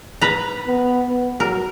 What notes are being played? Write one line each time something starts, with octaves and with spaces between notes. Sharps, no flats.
B4 A#5
B3
B3
F#3 A#4